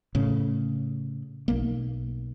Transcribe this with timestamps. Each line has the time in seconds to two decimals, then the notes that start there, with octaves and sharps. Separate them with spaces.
0.15 A2 C#3
1.48 B1 A#3